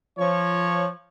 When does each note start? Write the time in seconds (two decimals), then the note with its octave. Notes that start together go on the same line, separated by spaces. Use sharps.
0.19 F3 C#5